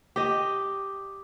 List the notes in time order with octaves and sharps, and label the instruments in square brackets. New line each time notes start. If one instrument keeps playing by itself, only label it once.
[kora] G4 D#5